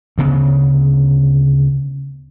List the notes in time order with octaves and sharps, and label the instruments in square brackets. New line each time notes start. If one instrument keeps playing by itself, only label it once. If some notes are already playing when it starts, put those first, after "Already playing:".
[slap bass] D2 C#3 B3